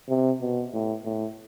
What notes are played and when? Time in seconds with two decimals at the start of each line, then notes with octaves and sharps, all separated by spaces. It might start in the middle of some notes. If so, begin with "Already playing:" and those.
0.09 C3
0.41 B2
0.73 A2
1.05 A2